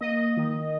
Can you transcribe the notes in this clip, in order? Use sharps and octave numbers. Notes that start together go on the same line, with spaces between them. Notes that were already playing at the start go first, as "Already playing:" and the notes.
A#3 D#5
D#3